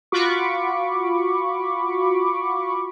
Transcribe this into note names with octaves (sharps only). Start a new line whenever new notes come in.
F4 F#4 B5 C#6 D6